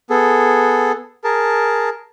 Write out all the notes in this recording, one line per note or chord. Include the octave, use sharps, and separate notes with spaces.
B3 G#4 A4
G#4 A#4 A5